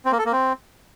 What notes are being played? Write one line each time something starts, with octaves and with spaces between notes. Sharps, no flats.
C4
A#3
A4
A#3
C4